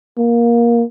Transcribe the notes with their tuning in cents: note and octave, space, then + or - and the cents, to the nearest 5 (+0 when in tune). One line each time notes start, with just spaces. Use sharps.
A#3 +15